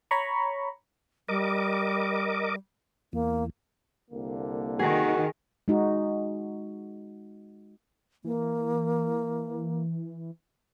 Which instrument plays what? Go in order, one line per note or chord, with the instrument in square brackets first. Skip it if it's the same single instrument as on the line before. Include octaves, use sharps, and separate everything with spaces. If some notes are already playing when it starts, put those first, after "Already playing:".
[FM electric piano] C#5 A#5 B5 C#6
[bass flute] G3 [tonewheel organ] A#4 D#5 D6
[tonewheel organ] E2 [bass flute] A#3
[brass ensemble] C2 D3 A#3
[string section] D#3 [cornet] F#4 [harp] G#4
[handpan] G#3 D#4 F#4
[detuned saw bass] E3 [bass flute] A#3